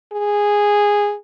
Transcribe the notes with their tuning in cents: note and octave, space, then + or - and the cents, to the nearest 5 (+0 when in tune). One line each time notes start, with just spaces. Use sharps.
G#4 -10